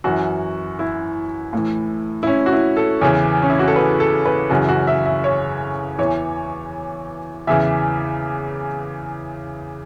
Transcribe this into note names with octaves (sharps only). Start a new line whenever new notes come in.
F#2 E3 F#4
E4
A2 E3
E4
C#4
F#4
E4
A4
E2 C#3 E3 C#5
C#4
E4
F#4
A4
B4
A4
B4
F#2 C#3 E3 F#4
F#4
E5
E5
C#5
E2 E3 C#5
E2 C#3 E3 E5